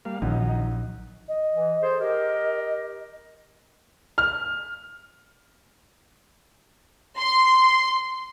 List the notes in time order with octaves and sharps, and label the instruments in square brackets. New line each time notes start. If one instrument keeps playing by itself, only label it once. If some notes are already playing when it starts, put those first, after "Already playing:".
[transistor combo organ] G3 A#3 F5
[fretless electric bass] A#1 [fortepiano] F#2 [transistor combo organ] D#3 D#4
[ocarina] D#5
[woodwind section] E3
G#4 A4 C5
[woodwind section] G4 A#4 [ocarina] D#5
[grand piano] F6
[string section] C6